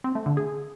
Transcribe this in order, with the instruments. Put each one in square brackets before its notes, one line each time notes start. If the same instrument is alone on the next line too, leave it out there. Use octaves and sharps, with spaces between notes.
[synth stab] C4
A3
D3
G#4